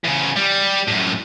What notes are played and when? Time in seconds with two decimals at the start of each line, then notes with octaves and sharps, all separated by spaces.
0.04 E2 C#3
0.36 G3
0.88 F#2 A2